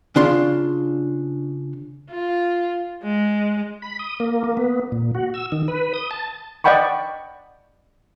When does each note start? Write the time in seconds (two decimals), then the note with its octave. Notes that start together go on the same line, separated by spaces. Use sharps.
0.16 C#3 D4 F4 C6
2.11 F4
3.03 G#3
3.82 B5
3.99 D#6
4.20 A#3
4.44 A#3
4.57 B3
4.92 A#2
5.15 F#4
5.34 E6
5.52 D#3
5.68 B4
5.94 D#6
6.11 A5
6.64 D5 D#5 F#5 G5 B5 C#6